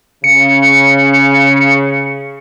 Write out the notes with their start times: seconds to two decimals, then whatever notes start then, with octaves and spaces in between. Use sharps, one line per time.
0.24 C#3 C#7